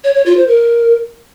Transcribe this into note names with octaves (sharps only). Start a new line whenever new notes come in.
C#5
C#5
F4
C5
A#4